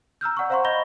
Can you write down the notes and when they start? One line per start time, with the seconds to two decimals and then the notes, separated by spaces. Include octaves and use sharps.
0.21 A#5 E6 F6 G6
0.37 D5 F#5 A#5 C#6
0.50 C5 F5 F#5 A#5 C6 C#6
0.64 D#5 B5 G6 A#6 G7